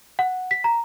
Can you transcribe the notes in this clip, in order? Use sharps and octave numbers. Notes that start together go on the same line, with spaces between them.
F#5
B6
A#5